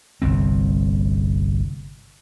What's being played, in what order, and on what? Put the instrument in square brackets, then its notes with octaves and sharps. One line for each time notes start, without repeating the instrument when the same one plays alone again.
[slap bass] G1 C2 C4